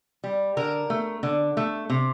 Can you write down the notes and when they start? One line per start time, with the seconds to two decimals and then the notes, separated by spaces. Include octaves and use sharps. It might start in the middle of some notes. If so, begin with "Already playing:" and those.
0.24 G3
0.57 D3 A#4
0.90 A3
1.23 D3
1.57 A3
1.90 C3